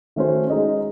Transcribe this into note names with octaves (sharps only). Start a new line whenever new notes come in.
D#3 A3 C#4 F#4 C5
G#3 D#4 G#4 D#5